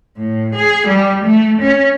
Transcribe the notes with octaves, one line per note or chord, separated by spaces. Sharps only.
A2
G#4
G3
A3
C#4